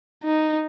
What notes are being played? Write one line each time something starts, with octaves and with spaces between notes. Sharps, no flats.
D#4